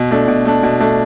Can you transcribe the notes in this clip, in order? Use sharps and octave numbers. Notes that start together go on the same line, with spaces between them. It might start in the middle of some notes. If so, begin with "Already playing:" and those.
Already playing: B2
A3 D4
B2
A3 D4
B2
A3 D4